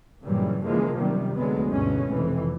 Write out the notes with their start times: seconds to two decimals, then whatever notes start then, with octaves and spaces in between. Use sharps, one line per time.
0.24 G2 A#2 C#3 E3 F#3 G3
0.65 C#3 E3 F3 G#3 A#3
0.96 F#2 C3 D#3 G3
1.37 D2 F#3 G#3 B3
1.70 G1 D2 B2 E3 G#3 C#4
2.09 F1 F2 E3